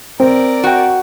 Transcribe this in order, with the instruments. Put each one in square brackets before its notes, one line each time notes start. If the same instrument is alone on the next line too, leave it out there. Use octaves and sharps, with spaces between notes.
[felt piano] C4 [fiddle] A#4 D5
[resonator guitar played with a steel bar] F#4 G5